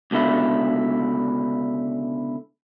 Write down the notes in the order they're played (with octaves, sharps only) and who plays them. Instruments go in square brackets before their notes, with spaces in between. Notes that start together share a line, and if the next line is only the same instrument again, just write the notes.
[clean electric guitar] C#2 B2 D3 E4